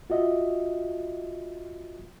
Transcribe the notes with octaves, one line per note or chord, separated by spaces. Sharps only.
F4 F#4 D#5 E5